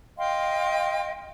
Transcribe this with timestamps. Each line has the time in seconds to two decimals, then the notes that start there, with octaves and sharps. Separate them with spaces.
0.18 D#5 F5 G5 C6